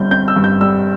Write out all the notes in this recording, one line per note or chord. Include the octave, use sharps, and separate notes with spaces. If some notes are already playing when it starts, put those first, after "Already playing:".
Already playing: G1 G2 G3 C4 G6
C4 G6
E6
G2
G6
G3 E6